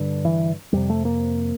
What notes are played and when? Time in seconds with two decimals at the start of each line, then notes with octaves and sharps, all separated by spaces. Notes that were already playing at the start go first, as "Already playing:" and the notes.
Already playing: G2 D3
0.25 E3
0.73 F2 C3 G3
0.90 A3
1.05 A#3